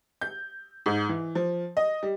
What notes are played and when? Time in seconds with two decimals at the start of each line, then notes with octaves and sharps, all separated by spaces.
0.21 G6
0.86 G#2
1.09 E3
1.35 F3
1.77 D#5
2.03 G3